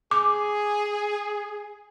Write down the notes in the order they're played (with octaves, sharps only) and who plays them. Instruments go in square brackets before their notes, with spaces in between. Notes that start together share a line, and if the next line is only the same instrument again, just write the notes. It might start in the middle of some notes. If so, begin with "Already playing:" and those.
[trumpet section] G#4 [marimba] D6